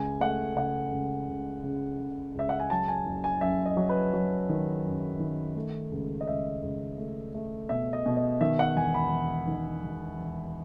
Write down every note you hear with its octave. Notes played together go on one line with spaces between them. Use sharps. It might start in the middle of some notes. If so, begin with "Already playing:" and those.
Already playing: C#2 G#5
A3 F#5
C#3 F#5
C#2
C#2
C#3
C#3
C#2 E5
F#5
G#5
F#3 A5
G#5
F#1
G#5
F#2 E5
D#5
F#3
B4
F#3
D#3
F#2
D#3
A3
C#2
D#5
C#2 E5
C#2
A3
A3
B2 E5
D#5
B2
D#5
D#3 E5
F#5
E1 G#5
B5
E1
D#3
E1
E1